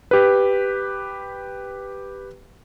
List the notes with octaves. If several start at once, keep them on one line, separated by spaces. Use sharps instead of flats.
G4 B4